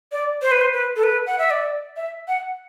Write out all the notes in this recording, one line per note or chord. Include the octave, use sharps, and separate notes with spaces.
D5
C5
B4
C5
B4
A4
B4
F#5
E5
D5
E5
F#5